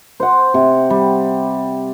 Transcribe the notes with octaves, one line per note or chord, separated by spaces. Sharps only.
C5 F#5
C3
G3